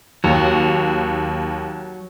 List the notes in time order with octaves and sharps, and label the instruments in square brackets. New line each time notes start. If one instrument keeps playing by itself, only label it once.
[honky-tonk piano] D#2 [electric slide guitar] F#3